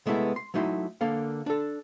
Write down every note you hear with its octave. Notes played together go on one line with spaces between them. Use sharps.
C3 G#3 A3 B3 E4
C6
F#3 A3 D#4 E4 C6
D3 A#3 A4 F5
D4 A4